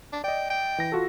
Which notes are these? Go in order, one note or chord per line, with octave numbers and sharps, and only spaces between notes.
D4
D5 D#5 G5
G5
E3 A#6
F4 F#4 A4